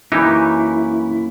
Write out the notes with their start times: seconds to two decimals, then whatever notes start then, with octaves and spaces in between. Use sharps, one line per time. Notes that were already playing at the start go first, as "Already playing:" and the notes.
0.12 F#2 E3 A#3 D#4 E4 G4 C#5